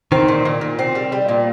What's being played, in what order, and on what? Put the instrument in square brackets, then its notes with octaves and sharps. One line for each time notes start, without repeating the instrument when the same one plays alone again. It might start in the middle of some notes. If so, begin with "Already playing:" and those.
[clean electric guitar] D#3 [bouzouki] C4
[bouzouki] A#2
A#2
A#2
C4
G3
G3
A#2